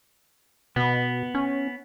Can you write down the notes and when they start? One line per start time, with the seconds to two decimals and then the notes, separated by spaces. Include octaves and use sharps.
0.76 B2 B3
1.35 C#4